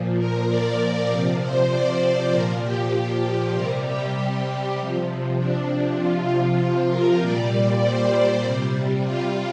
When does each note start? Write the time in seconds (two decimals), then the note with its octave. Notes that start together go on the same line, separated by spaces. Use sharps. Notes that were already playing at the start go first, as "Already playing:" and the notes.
Already playing: A#2 F3
0.18 A#4
0.48 D5
0.79 A#4
1.09 C3 F3 D5
1.40 C5
1.70 D5
2.01 C5
2.31 A#2 F3 A#4
2.62 G4
3.53 C3 G3 A#4
3.84 G4
4.77 C3 F3
5.37 D4
5.98 C3 F3 F4
6.59 F4
6.90 A#4
7.20 A#2 G3 D5
7.82 C5
8.42 C3 G3
9.03 F4